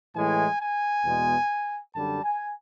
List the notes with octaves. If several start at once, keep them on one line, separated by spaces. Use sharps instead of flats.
A2 E3 G#3 G#5
G#5
E2 B2 G#3
F#2 D3 G3 A5
G#5